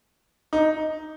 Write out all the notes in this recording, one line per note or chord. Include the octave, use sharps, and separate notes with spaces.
D#4